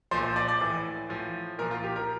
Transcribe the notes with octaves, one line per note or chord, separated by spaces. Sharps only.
A#2 F3 C5
C5
D5
D5
A2 E3
A2 F3
A#2 F3 A#4
F4
G4
A#4